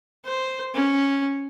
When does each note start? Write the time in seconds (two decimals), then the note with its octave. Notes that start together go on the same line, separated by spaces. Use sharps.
0.25 C5
0.74 C#4